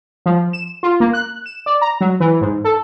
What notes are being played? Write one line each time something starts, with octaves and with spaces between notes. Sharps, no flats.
F3
E7
F4
A#3
F#6
E7
D5
A#5
F#3
E3
G#2
A4